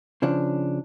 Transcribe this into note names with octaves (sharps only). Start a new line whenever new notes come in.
C#3 F3 D4